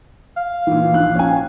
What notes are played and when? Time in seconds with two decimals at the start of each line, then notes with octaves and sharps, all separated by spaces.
0.36 F5
0.67 A#2 E3
0.94 A#1 F#6
1.15 C#4 G#5